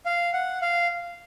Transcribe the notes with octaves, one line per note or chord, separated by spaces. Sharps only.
F5
F#5
F5